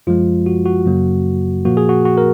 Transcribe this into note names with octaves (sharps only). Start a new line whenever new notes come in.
F#2 F3 G#3 F4
F#4
F#4
F#2 C#3 F#3 A#3
A#2 F3 A#3 F#4
G#4
F#4
F#4
A#4